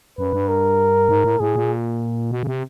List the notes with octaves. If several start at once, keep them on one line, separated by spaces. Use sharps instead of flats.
F#2 B4
G2
A#4
G#2
A2
A2 G#4
A#2
B2
C#3
C3